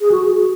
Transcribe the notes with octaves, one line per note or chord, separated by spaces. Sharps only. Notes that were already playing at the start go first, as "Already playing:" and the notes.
G#4
F#4